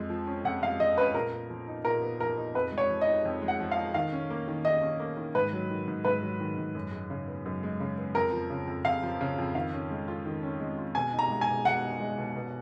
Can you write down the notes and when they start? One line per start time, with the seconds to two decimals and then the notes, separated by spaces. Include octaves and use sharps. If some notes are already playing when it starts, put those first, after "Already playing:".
Already playing: F2 G#3
0.10 F3
0.27 C#4
0.45 F2 F#5
0.62 G#3 F5
0.79 F3 D#5
0.97 C#4 B4
1.14 A#2 A#4
1.32 B3
1.50 F3
1.68 D#4
1.85 A#2 A#4
2.02 B3
2.20 F3 A#4
2.37 D#4
2.54 F2 B4
2.72 G#3
2.78 C#5
2.90 F3
3.01 D#5
3.08 D#4
3.25 F2
3.42 G#3
3.48 F#5
3.60 F3
3.71 F5
3.77 D#4
3.94 D#3 F5
4.13 C#4
4.30 A#3
4.48 D#3
4.65 D#3 D#5
4.82 C#4
5.00 A#3
5.17 D#3
5.35 G#2 B4
5.53 F#3
5.71 D#3
5.88 G#2
6.05 G#2 B4
6.22 F#3
6.40 D#3
6.57 G#2
6.75 F#2
6.92 G#3
7.10 C#3
7.28 B3
7.46 F#2
7.63 G#3
7.80 C#3
7.98 B3
8.15 F2 A#4
8.33 F3
8.50 C#3
8.67 F2
8.85 F2 F5
9.03 F3
9.21 C#3
9.38 F2
9.55 D#3 F5
9.73 C#4
9.91 G#3
10.08 F4
10.25 D#3
10.43 C#4
10.60 G#3
10.78 F4
10.95 B2 G#5
11.13 D#4
11.19 A#5
11.30 G#3
11.41 G#5
11.48 B2
11.65 B2 F#5
11.83 D#4
12.00 G#3
12.18 B2
12.35 B2